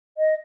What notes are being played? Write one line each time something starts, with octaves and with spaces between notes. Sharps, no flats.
D#5